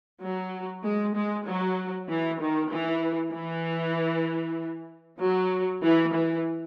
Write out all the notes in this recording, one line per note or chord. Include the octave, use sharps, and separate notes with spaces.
F#3
G#3
G#3
F#3
E3
D#3
E3
E3
F#3
E3
E3